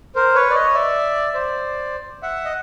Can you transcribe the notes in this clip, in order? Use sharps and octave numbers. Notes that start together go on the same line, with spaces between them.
A#4 C5
B4 C#5
D5
C#5 D#5
D5 E5
C5 D5
E5 F#5
D#5